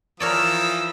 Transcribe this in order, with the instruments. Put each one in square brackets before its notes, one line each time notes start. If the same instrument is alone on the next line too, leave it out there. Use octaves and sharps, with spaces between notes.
[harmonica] E3 F3 D#6 [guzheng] A#4 C#5 D5 [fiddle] E6